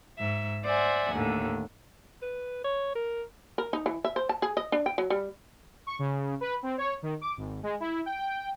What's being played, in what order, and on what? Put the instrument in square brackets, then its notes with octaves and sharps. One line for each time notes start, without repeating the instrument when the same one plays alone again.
[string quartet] G#2 E5
C5 D5 E5 F#5 G#5
D#2 A2 D3
[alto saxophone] B4
C#5
A#4
[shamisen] A#4
D#4
E3
E5
C5
A5
G#4
D#5
D4
G5
F#3
G3
[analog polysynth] C#6
C#3
B4
C4
C#5
D#3
D6
G#1
G#3
E4
G5